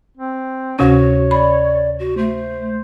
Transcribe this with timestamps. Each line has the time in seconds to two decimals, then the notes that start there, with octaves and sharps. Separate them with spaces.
0.17 C4
0.79 D2 C3 C#4 F#4 C#5
1.31 D5 B5
1.99 F#4
2.17 A3 C5